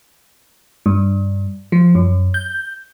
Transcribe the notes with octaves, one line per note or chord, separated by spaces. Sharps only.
G2
F3
F#2
G6